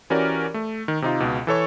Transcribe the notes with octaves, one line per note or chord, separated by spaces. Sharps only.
E3 C#4 F#4 G4 A#4 D5
A3
D#3
C3 D#4 F4
C#2 B2
E3 A4 C#5 C#6